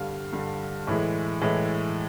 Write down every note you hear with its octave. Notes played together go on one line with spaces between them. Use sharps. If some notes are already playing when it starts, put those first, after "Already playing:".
Already playing: G2 D3 G3 F5
G2 D3 G3
A2 E3 G#3
A2 E3 G#3